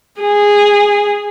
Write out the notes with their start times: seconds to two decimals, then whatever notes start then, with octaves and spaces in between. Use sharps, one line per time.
0.21 G#4